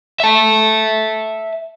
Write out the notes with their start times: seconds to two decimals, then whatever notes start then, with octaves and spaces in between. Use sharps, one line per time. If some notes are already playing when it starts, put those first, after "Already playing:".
0.20 E5 A5